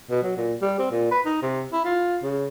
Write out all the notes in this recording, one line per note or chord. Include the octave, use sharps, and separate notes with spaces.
B2
F#3
A#2
G3
C4
A#2
B4
D#4
C3
E4
F4
C#3